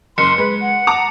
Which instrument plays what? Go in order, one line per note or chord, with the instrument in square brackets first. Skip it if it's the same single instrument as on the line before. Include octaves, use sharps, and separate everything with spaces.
[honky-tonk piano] F#1 [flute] C6 [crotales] C#7
[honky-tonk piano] G#3 [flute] B4
[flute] F#5
[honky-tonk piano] A5 A#5 D6